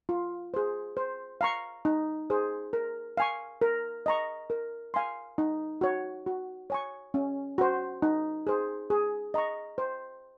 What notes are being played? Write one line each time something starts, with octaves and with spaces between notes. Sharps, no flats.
F4
G#4 C5
C5
F5 A#5 C#6
D#4
G#4 C5
A#4
F5 G#5 C#6
A#4
D#5 A#5 C#6
A#4
F5 G#5 C6
D#4
F#4 C#5
F#4
C#5 G#5 C#6
C#4
F#4 C5
D#4
G#4 C5
G#4
D#5 A#5 C#6
C5